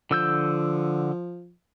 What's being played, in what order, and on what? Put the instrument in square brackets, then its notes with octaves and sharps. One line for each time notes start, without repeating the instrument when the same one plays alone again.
[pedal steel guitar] D3 E6 G6 [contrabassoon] F3